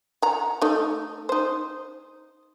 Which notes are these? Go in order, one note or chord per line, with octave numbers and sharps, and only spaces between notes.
F#5 A#5
A3 D#4
D#4 C5